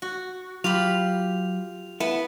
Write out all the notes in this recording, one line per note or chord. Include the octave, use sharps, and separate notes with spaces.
F#4
F#3 F4 G4 B5 F7
B3 E4 A5